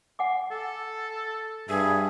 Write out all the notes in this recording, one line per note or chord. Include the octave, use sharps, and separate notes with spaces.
F#5 G#5 D6
A4
G2 G#4 E5